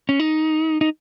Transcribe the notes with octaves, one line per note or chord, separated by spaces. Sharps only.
C#4
D#4
D#4